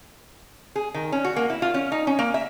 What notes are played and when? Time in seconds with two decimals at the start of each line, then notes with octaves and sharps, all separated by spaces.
0.76 G#4
0.94 D#3
1.12 C#4
1.25 F#4
1.36 A#3
1.50 E4
1.62 F4
1.74 C#4
1.92 D#4
2.07 C#4
2.19 A#3
2.34 E5